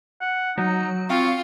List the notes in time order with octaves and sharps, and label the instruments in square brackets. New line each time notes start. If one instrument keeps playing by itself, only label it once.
[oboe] F#5
[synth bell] F#3 [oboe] D#4
[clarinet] C4 [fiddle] F4 [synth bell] F5 [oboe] C#6